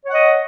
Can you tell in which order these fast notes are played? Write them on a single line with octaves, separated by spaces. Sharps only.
C#5 F#5 D#5